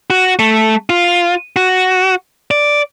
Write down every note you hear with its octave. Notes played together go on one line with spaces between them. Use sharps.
F#4
A3
F4
F#4
D5